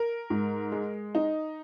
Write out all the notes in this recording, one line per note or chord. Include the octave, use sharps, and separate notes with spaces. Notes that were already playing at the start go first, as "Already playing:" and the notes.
Already playing: A#4
G#2
G#3
D#4